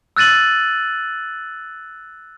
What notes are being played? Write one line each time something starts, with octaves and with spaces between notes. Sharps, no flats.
E6 F#6 A6 D#7 F#7